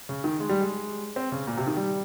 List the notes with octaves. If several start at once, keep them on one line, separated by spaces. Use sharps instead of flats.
C#3
D#3
G#3
G3
G#3
C4
C#3
A#2
C3
D#3
G3